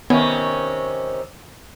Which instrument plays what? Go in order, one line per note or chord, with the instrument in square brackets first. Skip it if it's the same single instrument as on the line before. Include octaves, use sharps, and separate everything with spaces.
[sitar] C3 D#3 C#4 [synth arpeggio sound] B3